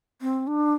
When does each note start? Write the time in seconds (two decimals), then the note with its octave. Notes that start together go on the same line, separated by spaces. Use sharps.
0.21 C4
0.47 D4